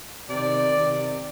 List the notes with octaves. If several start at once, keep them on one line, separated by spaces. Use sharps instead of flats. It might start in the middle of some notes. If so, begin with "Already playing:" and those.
C3 D#3 D5
C3 D#3